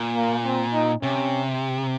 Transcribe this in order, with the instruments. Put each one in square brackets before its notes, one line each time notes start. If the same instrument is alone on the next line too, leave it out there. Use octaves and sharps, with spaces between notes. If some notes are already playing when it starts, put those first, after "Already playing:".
Already playing: [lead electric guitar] A#2
[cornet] A#3
C4
D#4
[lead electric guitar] C3 [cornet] C#4